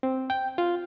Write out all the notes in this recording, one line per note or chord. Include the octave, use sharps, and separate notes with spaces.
C4
G5
F4